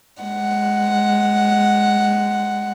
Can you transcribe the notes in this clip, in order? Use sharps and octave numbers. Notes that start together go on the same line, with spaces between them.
G#3 F#5